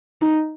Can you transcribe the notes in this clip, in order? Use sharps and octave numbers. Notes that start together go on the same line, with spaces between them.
D#4